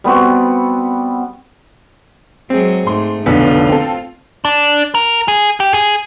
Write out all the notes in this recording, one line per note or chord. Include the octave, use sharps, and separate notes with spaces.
G3 B3 C4 F#4
F#3 G#3 C4 G#4
G#2 A3 C6
F1 B1 D3 B3 D4 F4
C4 A4
D4
A#4
G#4
G4
G#4